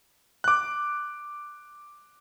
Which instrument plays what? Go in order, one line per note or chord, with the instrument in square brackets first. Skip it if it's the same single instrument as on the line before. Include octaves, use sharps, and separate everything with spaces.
[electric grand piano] D6 F#6